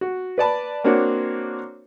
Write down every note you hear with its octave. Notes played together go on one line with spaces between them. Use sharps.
F#4
B4 D5 A5 B5
A#3 C4 D4 F#4 C#5